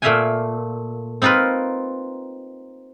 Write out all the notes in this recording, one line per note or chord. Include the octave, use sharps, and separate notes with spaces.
A#2 A3 E5 F5 G5 G#5
C4 D#4 F4 A#4 B4